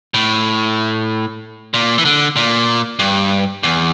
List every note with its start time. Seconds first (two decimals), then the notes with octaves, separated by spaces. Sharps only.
0.14 A2
1.74 A#2
1.98 E3
2.05 D3
2.36 A#2
2.99 G2
3.63 E2